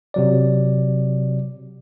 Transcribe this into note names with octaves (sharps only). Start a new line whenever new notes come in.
C3 F#3 D5